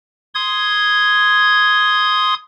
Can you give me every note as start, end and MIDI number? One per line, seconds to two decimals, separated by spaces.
0.35 2.34 84
0.35 2.34 87
0.35 2.34 92